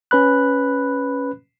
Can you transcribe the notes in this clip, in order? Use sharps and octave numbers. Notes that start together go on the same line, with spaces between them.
C#4 B4 B5 F#6